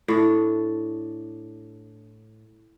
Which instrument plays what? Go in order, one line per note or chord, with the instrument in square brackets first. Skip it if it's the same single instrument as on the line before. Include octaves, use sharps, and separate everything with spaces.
[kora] A2 D4